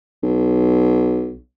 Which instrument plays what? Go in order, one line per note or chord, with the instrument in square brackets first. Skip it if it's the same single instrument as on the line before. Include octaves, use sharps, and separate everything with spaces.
[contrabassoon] B1